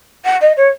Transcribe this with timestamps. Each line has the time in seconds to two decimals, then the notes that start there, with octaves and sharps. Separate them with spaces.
0.24 F#5
0.41 D#5
0.57 C#5